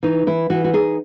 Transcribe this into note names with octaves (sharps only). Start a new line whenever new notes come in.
E3 D#4
E3 E4
E3 F#4
F#4
D#4 G#4